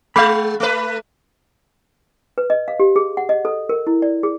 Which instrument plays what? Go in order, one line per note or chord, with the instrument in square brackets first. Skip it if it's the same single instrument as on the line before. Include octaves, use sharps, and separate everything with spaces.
[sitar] G#3 [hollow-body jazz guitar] F5 B5
[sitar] A3 B4
[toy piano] B4
D#5
F5
G4
G#4
F#5
D#5
A4
A#4
E4
D5
G#4